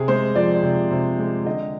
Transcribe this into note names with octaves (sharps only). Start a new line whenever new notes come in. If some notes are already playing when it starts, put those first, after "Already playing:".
Already playing: C3 G#4
G#3 C5
F3 D5
C3
C3
G#3
D3 D#5